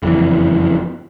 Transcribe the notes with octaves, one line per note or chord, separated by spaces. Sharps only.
F#1 F2 E3